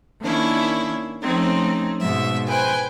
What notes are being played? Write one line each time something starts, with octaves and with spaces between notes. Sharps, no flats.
D#3 A#3 C#4 D4 E4
F3 A3 C4 C#4 D#4
G#2 B2 E5
B4 C5 G5 G#5